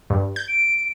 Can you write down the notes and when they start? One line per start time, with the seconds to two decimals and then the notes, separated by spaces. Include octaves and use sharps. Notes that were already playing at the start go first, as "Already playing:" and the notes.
0.10 G2
0.36 G6
0.48 D7